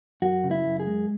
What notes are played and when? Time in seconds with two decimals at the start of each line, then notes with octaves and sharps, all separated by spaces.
0.22 F#2 F#4
0.44 C#3
0.51 E4
0.66 F#2
0.80 G#4
0.87 G#3